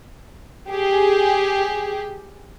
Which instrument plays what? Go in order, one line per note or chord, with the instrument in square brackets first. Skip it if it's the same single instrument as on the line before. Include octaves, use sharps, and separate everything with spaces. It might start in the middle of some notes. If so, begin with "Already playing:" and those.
[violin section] G4 G#4